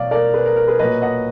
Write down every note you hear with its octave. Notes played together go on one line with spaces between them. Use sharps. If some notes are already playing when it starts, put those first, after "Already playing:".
Already playing: B2 F#3 D5 F5
A#4 D5
G#4 B4
A#4
A#4
G#4 B4
A#2 F#3 B4 D#5
D#5 F#5